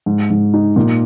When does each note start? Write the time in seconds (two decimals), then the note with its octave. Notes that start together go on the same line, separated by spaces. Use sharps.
0.06 G#2
0.30 G#2
0.54 D#4
0.76 A#2